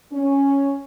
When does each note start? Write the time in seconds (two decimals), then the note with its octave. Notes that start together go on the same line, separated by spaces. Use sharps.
0.12 C#4